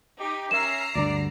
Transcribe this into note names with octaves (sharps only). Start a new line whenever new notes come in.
D#4 G4
C#4 A#4 E5 A#5 C7 E7
D2 G2 D3 D5